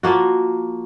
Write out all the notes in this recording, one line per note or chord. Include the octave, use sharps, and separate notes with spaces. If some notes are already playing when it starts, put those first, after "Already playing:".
F3 A#3 F#4